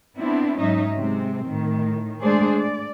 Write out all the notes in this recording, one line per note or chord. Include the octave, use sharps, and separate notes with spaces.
B3 C4 D4 E4
G#2 F#3 C#4 D#4 D#5 E5
C3 G#3 C4
A2 D#3
G#3 A3 D4 G#4 C5 D5
D5